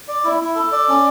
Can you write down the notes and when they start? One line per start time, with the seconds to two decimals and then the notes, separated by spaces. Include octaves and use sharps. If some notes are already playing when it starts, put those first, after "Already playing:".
0.08 D5
0.24 E4
0.40 E4
0.55 A4
0.72 D5
0.89 C#4